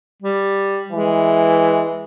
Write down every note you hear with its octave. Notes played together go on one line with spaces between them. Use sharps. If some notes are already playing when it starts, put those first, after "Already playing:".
G3
E3 G#3